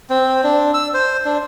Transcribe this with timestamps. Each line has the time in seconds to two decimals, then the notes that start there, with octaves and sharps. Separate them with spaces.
0.10 C4
0.44 D4
0.74 E6
0.94 C5
1.25 D4